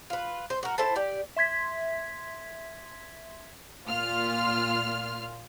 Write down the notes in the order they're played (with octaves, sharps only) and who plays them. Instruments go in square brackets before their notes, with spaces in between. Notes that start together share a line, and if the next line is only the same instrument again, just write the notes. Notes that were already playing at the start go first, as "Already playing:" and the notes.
[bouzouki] F4 B4
C5
F#4 A#4
E4 A4 C5 A5
G4 D5
[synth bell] E5 C6 G#6 B6
[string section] A#2 F4 F6